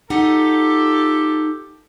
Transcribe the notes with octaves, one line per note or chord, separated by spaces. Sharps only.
D#4 F4 G4 A4 F#5